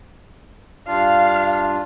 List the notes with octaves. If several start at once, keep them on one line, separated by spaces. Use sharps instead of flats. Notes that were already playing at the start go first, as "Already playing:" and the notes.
G2 D4 F4 F5